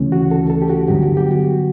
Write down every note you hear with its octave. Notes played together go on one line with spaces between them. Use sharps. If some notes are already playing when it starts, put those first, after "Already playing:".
Already playing: D2 C#3 E3 A3 C#4
F#4
A4
A4
G4
F#4
G2 D3 F#3 B3 G4
F#4
G4
F#4